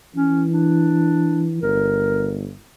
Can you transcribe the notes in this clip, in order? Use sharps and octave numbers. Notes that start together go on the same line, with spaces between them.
E3 C#4
D4
G1 A#4